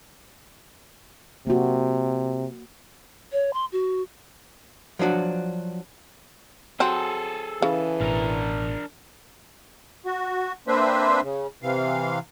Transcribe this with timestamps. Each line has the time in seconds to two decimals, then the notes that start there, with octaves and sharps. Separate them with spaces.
1.47 C3 A#3 F#4
3.32 C#5
3.54 C6
3.72 F#4
4.99 F3 F#3 D4 F#4
6.80 F#3 C4 G#4 A4
7.62 C#3 E3
8.00 A1 B2 D4 A#4
10.06 F#4
10.68 A#3 C4 D4 B4 C5 E5
11.23 C#3
11.63 C3 E3 F5